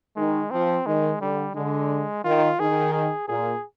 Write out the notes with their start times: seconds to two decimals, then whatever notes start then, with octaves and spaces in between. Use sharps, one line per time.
0.16 D#3 G#3
0.51 F3 C4
0.86 D#3 G#3
1.21 D3 G3
1.55 D3 G#3
2.24 D#3 F4
2.60 D#3 G#4
2.93 G#4
3.28 A#2 G#4